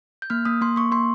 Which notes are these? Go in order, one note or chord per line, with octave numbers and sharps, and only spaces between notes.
G6
A#3 F6
A#3 D#6
A#3 C6
A#3 C#6
A#3 C6